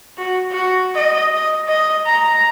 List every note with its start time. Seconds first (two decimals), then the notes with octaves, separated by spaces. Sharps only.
0.18 F#4
0.50 F#4
0.94 D#5
1.34 D#5
1.67 D#5
2.06 A#5